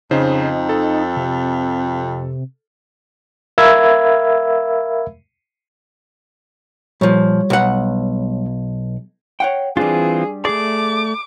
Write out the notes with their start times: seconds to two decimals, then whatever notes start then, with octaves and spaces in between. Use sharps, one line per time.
0.11 F2 C#3 D#4 C5
0.69 A4
1.16 C3
3.58 A#4 E5 F5 B5 E6 G#6
7.01 A#2 F3 G3 C#5
7.50 B1 F#5
9.40 C#5 F#5 G5
9.77 E3 G3 C4 D4 F4 G#4
10.45 A3 G#4 D5 D6